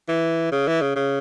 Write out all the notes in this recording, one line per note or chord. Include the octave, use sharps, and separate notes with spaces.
E3
C#3
E3
C#3
C#3